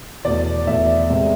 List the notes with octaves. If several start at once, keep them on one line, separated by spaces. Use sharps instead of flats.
E2 B2 A3 D5
E2 B2 A3 E5
C3 G#3 E5